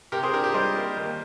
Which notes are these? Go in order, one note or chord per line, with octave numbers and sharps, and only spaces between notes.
C3 G4 A#4
G#4 C5
D4 G4 A#4
G4
G3 C5 D#5
A#3
D#2